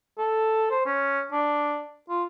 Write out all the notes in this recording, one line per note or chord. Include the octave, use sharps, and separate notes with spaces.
A4
C5
C#4
D4
F4